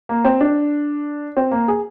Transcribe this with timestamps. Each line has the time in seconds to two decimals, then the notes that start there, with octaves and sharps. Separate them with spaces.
0.09 A#3
0.25 C4
0.41 D4
1.37 C4
1.51 A#3
1.68 G#4